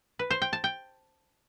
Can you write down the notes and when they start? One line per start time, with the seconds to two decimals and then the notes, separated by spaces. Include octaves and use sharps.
0.19 B4
0.30 C5
0.42 G5
0.53 A5
0.64 G5